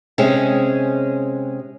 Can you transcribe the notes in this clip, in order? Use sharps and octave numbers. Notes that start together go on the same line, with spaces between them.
C3 G#3 C#4 G#4